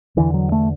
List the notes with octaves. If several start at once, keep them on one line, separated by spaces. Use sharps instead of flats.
E2 D3 E3
F#3
A3